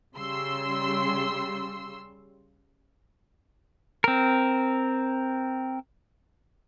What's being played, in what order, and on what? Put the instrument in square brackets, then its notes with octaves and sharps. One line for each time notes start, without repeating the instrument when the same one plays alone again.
[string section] C#3 G3 C6 E6
[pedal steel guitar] C4 A#4